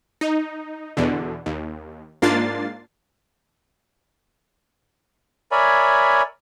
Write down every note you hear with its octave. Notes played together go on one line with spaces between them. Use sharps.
D#4
E2 B2 D3
D#2
G#2 A#3 D4 F4 A6 C7
A#4 C#5 D5 E5 G#5 B5